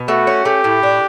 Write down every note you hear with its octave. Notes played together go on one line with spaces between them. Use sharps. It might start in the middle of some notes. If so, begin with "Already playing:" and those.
Already playing: B2
A3 F#4
C#4
A3 G4
A2
D4